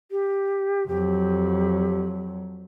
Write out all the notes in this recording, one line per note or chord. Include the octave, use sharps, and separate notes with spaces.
G4
F2 F#3 G4